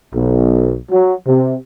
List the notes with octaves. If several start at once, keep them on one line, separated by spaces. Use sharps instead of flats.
B1
F#3
C3